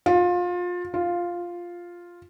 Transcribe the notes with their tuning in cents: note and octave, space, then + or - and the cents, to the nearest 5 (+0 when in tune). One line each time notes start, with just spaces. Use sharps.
F4 +25
F4 +0